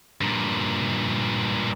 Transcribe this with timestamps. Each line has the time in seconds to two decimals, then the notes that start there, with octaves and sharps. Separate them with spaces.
0.21 G2 A#2